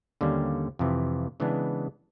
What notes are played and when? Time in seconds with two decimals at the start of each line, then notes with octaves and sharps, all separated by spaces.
0.21 D#2 D3 G3 A#3 C#4
0.79 F2 C3 E3
1.40 C#3 E3 G#3 B3 D4